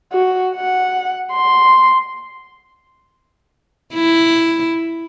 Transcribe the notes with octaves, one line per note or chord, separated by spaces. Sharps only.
F#4
F#5
C6
E4